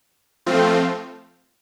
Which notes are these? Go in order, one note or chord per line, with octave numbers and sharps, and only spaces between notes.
F3 A3 C4 F4